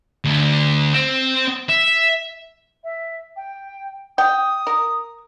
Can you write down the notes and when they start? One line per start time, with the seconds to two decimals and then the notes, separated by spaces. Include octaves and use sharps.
0.24 D2
0.93 C4
1.69 E5
2.83 E5
3.36 G5
4.18 G5 D#6
4.67 A#4